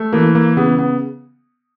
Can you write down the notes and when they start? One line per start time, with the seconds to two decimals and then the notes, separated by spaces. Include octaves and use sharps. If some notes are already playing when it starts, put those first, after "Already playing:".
Already playing: A3
0.13 E3 A#3
0.35 A#3
0.57 C#3 B3
0.79 B3